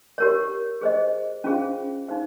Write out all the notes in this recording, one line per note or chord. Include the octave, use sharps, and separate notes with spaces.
G4 A#4 C#5
G#4 C5 D#5
C#4 F4 G#4 C5 F5
D#4 G#4 C5 F5